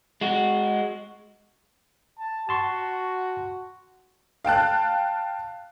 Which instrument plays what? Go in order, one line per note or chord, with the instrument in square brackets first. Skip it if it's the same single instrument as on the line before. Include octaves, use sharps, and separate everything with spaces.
[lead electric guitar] G#3 F#4
[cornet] A5
[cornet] F#4 [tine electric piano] A5 C6 C#6
[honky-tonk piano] F5 G5 A5 F#6